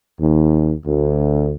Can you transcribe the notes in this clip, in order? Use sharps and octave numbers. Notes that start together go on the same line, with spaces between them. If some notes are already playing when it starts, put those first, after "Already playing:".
D#2
D2